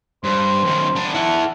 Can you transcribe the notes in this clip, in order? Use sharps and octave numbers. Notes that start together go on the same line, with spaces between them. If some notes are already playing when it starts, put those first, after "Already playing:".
G2 C5
F#2 D#3
B3 D4
E4 A4 F#5